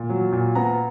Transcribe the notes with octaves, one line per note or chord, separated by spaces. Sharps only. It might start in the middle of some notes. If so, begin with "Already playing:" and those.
Already playing: A#2
F#3
A#2
B3 A#5